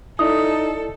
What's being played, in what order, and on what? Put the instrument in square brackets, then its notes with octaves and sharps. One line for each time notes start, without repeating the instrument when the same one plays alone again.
[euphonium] D#4 [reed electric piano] E4 D5 [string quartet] A4 [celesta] D#6